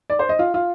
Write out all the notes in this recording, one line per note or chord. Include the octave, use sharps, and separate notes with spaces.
D5
C5
D#5
F4
F4